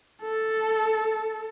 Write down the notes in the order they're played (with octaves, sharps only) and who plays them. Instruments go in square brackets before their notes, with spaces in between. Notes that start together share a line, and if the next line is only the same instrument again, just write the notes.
[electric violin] A4